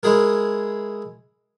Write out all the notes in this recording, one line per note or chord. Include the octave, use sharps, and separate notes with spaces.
G#3 E4 G#4 A#4